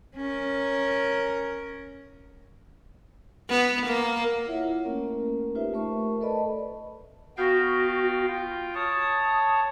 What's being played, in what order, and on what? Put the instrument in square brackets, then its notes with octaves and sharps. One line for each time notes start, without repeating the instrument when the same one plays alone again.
[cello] C#4 A#4
[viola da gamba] B3
A#3
[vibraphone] E4 F4 C#5 E5 F#5
A3 A#3 C#4 A#4
D#4 F4 G4 B4 C5 E5
A3 F4 A#4 C5 E5 C#6
A4 B4 D5 D#5 A5 B5
[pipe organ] B3 F5 G5 [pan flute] F#4
[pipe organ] F4 G5
[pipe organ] C#5 A5 [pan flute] D#6